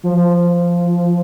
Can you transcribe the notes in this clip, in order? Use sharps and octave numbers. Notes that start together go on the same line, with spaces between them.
F3